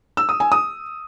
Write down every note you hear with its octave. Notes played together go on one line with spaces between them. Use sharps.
E6
D#6
G#5
D#6